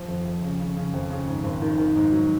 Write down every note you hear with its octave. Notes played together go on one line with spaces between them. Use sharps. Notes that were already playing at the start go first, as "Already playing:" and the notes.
Already playing: F3
F2
F2
C#3
C#3
C#3
F2
C#3
G#2
G#1
D#3
D#3
G#2
F#3